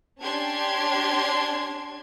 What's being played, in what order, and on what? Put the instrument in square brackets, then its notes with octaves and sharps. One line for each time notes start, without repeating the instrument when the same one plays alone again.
[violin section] C#4 D4 G4 A5 C6 G#6